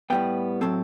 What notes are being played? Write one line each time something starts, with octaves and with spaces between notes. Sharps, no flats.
A2 G3 B3 G5
A2 F#3 C4 A4